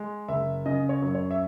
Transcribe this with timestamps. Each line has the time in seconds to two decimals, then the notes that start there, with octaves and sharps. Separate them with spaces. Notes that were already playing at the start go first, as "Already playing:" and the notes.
Already playing: G#3
0.28 F#1 E5
0.66 C#3 D#5
0.89 C#5
1.02 F#2
1.15 C#5
1.31 E5